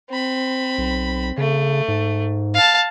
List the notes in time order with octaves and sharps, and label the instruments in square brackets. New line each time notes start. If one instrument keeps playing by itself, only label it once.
[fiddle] C4 B5
[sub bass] B1
[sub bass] C#3 [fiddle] A3
[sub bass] G#2
[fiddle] F5 A5